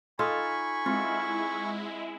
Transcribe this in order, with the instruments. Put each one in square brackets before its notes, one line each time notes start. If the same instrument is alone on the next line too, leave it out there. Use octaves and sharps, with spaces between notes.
[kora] D#4 F4 A4 [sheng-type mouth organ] G#5 B5 C#6
[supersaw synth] G#3 E4 [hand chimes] C4 [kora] F4